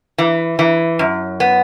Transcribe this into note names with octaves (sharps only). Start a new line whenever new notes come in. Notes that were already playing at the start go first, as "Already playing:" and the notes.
E3
E3
F#2
B3